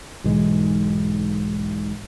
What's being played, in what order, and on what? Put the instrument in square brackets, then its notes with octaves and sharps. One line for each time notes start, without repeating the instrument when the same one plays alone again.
[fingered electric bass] B1 G#2 E3 G#3